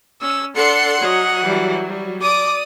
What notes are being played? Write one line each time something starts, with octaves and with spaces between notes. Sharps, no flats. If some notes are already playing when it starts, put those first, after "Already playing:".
C#4 E6
D4 A4 F#5 C6 C#7
F#3 C#5 D#5
E3 G3
G3
D5 D6 D#6